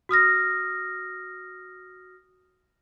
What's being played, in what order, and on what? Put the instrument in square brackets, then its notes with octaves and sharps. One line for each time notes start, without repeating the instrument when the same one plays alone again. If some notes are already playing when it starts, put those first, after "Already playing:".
[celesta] F#4 D#6 F6 A#6